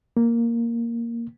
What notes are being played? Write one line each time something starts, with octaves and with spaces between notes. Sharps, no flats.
A#3